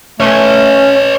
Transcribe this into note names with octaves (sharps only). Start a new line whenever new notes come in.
A3 C#4 B4 C#5